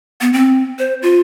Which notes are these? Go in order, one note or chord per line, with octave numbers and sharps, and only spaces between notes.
B3
C4
C5
F4